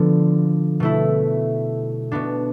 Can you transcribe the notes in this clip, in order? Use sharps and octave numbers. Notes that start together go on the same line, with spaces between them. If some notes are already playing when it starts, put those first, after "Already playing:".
Already playing: D3 F3 B3 D4 F4
B2 A3 E4
B2 B3 D4